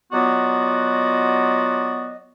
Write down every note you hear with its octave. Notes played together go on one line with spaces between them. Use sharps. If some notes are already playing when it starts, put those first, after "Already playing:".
F#3 B3 F4 F#4 D5 D#5